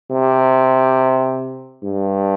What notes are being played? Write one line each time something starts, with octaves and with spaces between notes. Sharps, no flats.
C3
G2